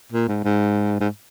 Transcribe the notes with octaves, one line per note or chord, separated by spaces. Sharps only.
A#2
G#2
G#2
G#2